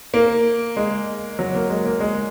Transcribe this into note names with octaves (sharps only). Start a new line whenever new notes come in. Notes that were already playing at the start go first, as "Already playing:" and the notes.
A#3
G#3
F#3
A#3
G#3
A#3
G#3